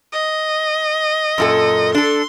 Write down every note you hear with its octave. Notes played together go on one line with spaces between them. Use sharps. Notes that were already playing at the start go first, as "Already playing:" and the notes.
D#5
F#2 A#2 A4
D4 A4 C6